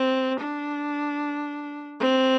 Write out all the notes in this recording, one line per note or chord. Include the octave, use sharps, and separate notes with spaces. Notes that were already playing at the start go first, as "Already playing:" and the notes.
Already playing: C4
D4
C4